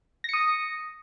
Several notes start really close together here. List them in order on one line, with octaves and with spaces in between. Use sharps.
A#6 C#7 D#6